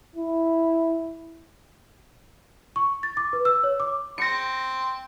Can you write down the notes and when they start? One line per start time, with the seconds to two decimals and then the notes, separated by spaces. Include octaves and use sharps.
0.16 E4
2.76 C#6
3.03 A6
3.17 D6
3.33 B4
3.45 E6
3.64 C#5
3.80 D6
4.18 C4 A#6 C#7